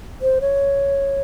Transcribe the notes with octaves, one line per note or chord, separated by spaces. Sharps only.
C5
C#5